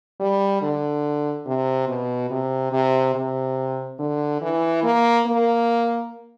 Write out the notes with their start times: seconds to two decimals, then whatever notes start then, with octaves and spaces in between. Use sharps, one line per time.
0.20 G3
0.61 D3
1.46 C3
1.88 B2
2.30 C3
2.72 C3
3.15 C3
3.99 D3
4.41 E3
4.83 A#3
5.26 A#3